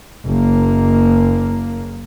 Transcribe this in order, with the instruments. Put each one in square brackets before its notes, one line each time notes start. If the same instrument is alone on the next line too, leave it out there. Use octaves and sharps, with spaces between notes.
[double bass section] F#1 A#3